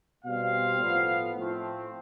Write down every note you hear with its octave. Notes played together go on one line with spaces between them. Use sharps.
B2 G3 C4 F5
A2 F3 B3
A2 F3 A3 C4